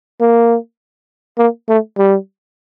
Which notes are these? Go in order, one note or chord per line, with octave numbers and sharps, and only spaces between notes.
A#3
A#3
A3
G3